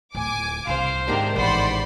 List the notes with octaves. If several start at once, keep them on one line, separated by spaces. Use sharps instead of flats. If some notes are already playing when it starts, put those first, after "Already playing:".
D1 F4 G#5 D6
C2 C5 F5
G#2 C3 D#3 D4 G4 A#4
A1 C5 D5 F#5 B5 C6